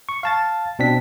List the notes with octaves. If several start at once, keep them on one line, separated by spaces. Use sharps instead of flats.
C#6
F5 A5 A6
B2 C4 D4 B6